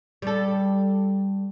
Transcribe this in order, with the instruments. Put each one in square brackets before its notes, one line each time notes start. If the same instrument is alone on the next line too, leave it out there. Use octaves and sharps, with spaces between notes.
[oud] G3 A4